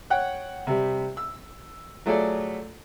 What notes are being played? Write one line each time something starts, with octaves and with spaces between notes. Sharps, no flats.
C#5 F#5 G5 F#6
C3 G3
E6
F#3 A3 F4 G#4 A4 D5